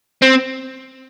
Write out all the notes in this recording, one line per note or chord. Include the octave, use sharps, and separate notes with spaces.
C4